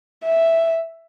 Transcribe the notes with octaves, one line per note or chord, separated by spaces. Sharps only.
E5